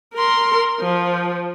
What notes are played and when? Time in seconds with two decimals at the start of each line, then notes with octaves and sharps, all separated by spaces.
0.14 A#4 C6
0.81 F3